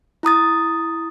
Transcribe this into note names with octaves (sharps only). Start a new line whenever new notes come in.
E4 A#5 D#6 A6